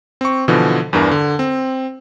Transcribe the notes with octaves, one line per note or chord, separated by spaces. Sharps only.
C4 C#6
B2 D3 E3 F3
E2 G2 E3 D4 A#4
D3
C4